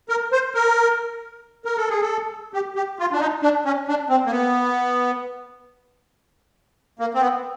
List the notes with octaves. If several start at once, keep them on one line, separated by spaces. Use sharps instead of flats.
A#4
C5
A#4
A#4
A4
G#4
A4
G4
G4
F4
D4
D#4
D4
C#4
D4
C4
A#3
B3
A#3
C4
B3